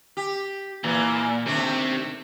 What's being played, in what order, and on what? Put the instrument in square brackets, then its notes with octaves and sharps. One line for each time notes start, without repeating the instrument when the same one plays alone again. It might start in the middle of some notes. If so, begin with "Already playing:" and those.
[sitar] G4
[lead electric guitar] A#2 [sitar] E3 A#3
[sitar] D#2 A3 D4 [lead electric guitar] C3 C4